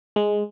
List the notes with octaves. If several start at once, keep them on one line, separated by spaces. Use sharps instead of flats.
G#3